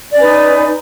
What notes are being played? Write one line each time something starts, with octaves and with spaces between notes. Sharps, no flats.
C#4 D#4 B4 D5